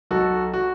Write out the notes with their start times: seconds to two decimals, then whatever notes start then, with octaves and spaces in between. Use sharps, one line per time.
0.11 B1 F#4 A4
0.53 F#4